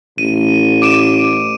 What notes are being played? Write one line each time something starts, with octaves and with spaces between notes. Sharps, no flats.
A1 D#7
D6 D7 E7